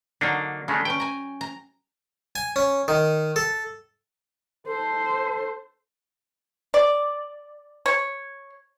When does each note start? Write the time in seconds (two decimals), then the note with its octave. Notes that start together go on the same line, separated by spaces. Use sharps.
0.21 D3 F#3 A#3 D4 D#4
0.68 C#3 G#3 A3 D4
0.85 C#4 B4 G5
1.00 G#5 A#5
1.41 A#5
2.36 G#5
2.56 C#4
2.88 D#3
3.36 A4
4.67 A4 C5
6.74 D5
7.86 C#5